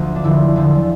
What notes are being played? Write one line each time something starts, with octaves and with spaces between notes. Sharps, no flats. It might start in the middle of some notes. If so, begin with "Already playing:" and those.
Already playing: D2 F3
D4
E2 D3 F3 E4
E2 D3 F3